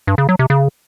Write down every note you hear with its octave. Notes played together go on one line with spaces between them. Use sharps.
G2
C#3
F#3
C3
C#3